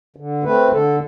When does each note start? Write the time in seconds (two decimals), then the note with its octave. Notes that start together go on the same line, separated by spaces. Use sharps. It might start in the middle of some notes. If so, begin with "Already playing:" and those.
0.16 D3
0.43 A3 C4 B4
0.71 D3 A4